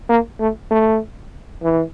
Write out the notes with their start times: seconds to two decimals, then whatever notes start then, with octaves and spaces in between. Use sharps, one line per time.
0.09 A#3
0.40 A3
0.71 A3
1.63 E3